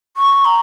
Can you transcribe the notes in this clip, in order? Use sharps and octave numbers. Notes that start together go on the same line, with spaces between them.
C#6
A#5